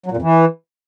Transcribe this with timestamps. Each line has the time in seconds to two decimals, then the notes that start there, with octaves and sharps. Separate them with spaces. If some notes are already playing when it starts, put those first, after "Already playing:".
0.06 F#3
0.11 A#2
0.17 F2
0.22 E3